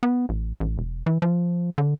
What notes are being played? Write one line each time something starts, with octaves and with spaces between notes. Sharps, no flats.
B3
A1
A1
E1
E3
F3
D3